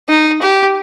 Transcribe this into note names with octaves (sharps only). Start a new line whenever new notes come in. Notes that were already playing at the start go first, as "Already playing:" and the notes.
D#4
G4